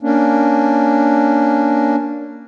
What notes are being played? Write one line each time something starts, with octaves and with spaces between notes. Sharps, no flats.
A#3 C#4 D4